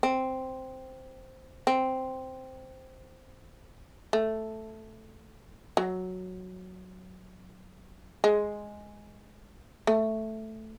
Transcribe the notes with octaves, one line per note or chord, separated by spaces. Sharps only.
C4
C4
A3
F#3
G#3
A3